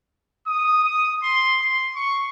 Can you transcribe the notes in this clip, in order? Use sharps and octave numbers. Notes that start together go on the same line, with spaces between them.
D#6
D#6
C6
C6
C#6